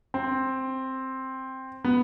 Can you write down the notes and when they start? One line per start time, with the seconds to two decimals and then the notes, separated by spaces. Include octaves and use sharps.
0.14 C4
1.84 B3